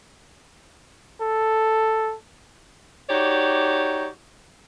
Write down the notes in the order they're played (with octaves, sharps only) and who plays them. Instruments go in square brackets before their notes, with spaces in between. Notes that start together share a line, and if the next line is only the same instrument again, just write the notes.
[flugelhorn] A4
[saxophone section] D#4 F#4 G4 C#5 D5